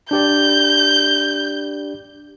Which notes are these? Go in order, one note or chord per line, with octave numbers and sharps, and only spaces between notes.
D4 G4 D5 G6